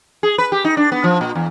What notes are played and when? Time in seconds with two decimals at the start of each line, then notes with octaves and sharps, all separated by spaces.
0.23 G#4
0.38 B4
0.52 G4
0.65 D#4
0.77 D4
0.92 B3
1.04 F3
1.21 A#2
1.36 E2